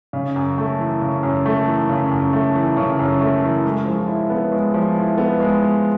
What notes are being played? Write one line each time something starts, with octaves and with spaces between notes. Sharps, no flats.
C#3
F#2
A3
E3
C#3
F#2
A3
E3
C#3
F#2
A3
E3
C#3
F#2
A3
E3
G#3
F3
E4
B3
G#3
F3
E4
B3
G#3